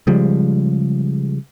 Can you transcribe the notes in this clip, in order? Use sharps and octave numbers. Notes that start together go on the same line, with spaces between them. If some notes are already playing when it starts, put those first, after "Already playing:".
C#3 F3 G3 G#3